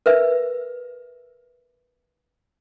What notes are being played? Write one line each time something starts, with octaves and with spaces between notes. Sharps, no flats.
A#4 B4 E5